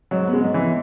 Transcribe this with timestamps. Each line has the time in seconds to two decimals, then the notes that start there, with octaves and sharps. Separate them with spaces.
0.11 G#2 F#3
0.27 B3
0.33 G#3
0.44 G#2
0.54 E3